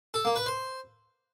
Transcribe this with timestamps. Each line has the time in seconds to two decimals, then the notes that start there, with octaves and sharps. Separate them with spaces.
0.14 A4
0.25 A#3
0.36 B4
0.46 C5